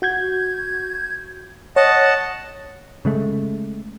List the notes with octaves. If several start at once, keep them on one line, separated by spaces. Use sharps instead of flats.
F#4 G6 G#6
C#5 D#5 F#5 A5
C#3 G#3 A3